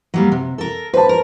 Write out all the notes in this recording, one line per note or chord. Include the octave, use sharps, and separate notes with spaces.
F#3 G3 A#3
C3
A4 A#4
B4 C5 A5
A#4